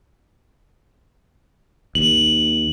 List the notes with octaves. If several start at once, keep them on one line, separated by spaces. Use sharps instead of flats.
D#2 F#7